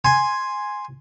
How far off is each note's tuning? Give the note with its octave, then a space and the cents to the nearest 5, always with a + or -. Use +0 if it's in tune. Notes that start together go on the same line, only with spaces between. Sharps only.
G#5 +0 C6 +0